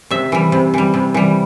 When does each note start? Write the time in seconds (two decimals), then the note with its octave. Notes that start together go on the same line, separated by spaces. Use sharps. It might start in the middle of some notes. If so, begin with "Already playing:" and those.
0.11 C3 E5
0.32 E3 G3
0.52 C3
0.74 E3 G3
0.94 C3
1.14 E3 G3